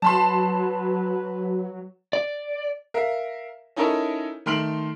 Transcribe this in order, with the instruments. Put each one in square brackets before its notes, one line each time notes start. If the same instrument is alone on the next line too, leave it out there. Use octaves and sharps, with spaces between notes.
[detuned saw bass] F#3 [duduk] B4 [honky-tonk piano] A5 B5 C6
[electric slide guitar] D5
[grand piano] A#4 E5 F5
C#4 D#4 E4 A4 A#4 C#5
D#3 A3 C6 F6 D7 F#7